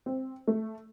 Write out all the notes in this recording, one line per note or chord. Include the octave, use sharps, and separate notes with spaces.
C4
A3